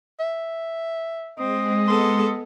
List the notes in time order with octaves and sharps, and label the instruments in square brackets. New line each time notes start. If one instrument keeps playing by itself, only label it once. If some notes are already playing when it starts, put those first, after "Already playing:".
[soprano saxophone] E5
[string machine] G#3 [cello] C4 [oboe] D#5
[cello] B3 A4 [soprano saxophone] C6